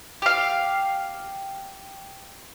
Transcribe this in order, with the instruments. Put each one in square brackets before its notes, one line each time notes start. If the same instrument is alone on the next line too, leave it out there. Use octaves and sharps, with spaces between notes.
[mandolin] G4 F5